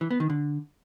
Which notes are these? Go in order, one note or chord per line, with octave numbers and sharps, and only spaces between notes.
E3
B3
D#3
D3